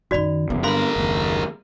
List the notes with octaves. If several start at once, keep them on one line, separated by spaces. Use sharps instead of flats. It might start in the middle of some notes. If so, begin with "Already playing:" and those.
F#2 D#3 F#4 D5 B5
F#1 E2 C3 B3
G2 D3 G#3 A#4 F5 B5 C6
F#1 D#2